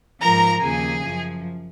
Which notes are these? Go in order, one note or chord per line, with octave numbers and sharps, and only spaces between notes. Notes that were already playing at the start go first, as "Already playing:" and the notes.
G#2 F3 A#4 A#5
D#2 C#3 F3 G#4 G#5
F#2 F3